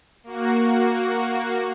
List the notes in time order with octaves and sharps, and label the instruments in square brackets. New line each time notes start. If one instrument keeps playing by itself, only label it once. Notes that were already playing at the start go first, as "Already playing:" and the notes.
[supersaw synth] A#3 F#4